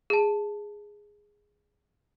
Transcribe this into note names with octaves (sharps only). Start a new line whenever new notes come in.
G#4 A5